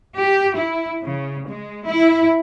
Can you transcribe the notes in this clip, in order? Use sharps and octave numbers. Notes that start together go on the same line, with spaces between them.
G4
E4
C#3
G#3
E4